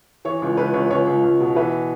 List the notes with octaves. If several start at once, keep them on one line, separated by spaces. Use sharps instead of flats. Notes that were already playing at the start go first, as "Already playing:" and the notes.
E3 C#5
C#2
C#2 B4
C#2 C#5
C#2 C#5
C#2
C#2
B2
E3 B4 E5